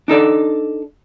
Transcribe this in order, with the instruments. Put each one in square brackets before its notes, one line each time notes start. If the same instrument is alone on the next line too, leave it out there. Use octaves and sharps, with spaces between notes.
[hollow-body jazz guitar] D4 D#4 A4 D5